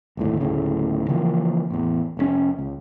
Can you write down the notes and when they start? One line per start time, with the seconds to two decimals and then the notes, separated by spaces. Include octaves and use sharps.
0.17 G1 D#2 A2
0.40 F#1 D2 A2 C#3
1.08 C#3 E3 F3 A#3
1.71 A1 E2
2.17 F1 G#2 C#4
2.59 C#2